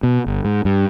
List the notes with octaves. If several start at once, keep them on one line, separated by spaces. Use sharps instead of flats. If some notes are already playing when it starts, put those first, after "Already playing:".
B2
G1
G#2
G2